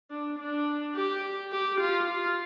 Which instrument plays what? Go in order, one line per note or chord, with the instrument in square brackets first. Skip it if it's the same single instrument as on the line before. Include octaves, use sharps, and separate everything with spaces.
[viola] D4
D4
G4
G4
F4
F4